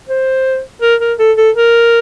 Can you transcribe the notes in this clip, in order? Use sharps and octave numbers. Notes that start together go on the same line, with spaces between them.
C5
A#4
A#4
A4
A4
A#4